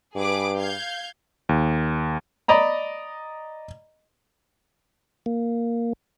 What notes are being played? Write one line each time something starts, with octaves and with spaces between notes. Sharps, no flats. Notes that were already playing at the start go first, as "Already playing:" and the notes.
G2 G#4 B4 D6
F5 G6 G#6
D#2
D5 D#5 A#5 B5
A#3